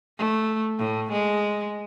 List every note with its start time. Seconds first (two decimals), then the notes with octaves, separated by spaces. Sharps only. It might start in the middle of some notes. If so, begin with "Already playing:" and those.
0.18 A3
0.78 A2
1.12 G#3